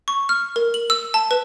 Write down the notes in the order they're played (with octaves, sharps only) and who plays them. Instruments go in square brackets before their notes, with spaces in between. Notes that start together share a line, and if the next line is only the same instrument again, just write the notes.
[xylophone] C#6
F6
A#4
F#7
E6
A5
B4